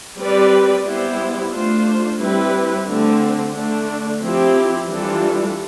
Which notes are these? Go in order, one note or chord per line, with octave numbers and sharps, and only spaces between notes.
G3 C4 G4 B4 D5
G3 B3 E4 G4 C5
A3 D4 F4 C5
G3 C4 E4 B4
D3 A3 C4
D3 A3 D4
F3 C4 E4 G4
E3 G3 D4 F4 A4